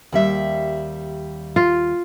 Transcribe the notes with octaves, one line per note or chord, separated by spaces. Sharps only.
D#2 G3 E5
F4